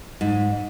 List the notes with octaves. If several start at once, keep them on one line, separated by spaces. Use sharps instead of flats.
G#2